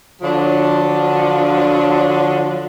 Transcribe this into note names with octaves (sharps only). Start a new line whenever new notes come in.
D3 F3 F#3 D4 F4